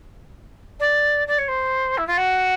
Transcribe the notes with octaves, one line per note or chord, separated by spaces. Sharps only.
D5
D5
C#5
C5
E4
F4
F#4